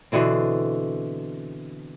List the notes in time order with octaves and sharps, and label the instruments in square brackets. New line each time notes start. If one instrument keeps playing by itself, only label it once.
[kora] B2 D3 E3 C4